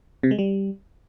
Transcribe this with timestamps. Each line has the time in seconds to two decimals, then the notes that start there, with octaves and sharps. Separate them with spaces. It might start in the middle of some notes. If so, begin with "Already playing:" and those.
0.23 C3
0.31 G#3
0.39 G3